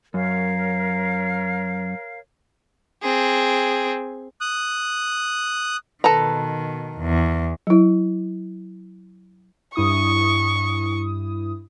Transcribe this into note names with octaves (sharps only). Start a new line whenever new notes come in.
F#2 A#4 C#5 F5
C4 G#4
D#6 F#6
B2 D#3 A4 B4 A#5
E2
F#3 E4
G2 E4 C#6 D#6